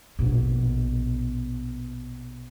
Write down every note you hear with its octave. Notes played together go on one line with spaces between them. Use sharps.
A#1 B2